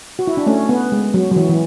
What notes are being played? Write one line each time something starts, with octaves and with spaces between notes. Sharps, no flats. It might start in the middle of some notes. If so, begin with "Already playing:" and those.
F#4
E4
D4
A3 C#4
B3
G#3
F#3
F#3
E3
E3